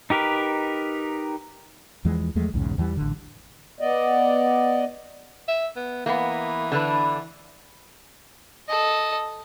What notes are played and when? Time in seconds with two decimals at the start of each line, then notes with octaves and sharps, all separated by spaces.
0.10 D#4 G4 A#4 B4
2.05 E2 E3 F3 G#3
2.35 E2 F3 G#3 A3
2.54 B1 E2 G#2 C#3
2.78 E2 E3 G3
2.97 A1 D3
3.80 B3 D5 D#5
5.48 E5
5.76 B3
6.06 E3 A#3 B3
6.72 D3 D4 B4
8.68 A4 D#5